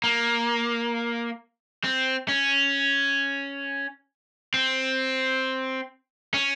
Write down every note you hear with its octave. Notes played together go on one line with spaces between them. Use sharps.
A#3
C4
C#4
C4
C#4